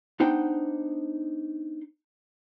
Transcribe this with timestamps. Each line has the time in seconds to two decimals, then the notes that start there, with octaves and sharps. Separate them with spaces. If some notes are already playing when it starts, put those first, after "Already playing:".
0.20 B3 D4 D#4 C5 F#5 G5